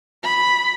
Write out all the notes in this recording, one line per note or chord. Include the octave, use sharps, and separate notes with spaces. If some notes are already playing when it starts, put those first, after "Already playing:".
B5